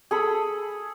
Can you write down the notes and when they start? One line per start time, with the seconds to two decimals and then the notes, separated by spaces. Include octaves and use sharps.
0.11 G#4 A4 B5